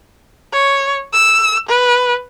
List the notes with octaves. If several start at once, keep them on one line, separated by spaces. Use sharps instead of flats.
C#5
E6
B4